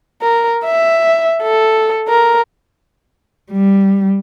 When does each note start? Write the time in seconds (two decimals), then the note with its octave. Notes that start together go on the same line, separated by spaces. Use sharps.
0.22 A#4
0.65 E5
1.43 A4
2.08 A#4
3.52 G3